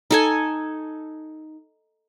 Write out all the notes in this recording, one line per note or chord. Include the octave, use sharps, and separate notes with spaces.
D#4 A4 G#5